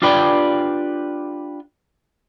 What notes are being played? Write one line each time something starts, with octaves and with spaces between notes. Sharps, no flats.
D4 F4 G4 B4 D5 G5